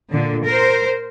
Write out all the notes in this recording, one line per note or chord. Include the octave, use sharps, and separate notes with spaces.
A#2 D3
A#4 C5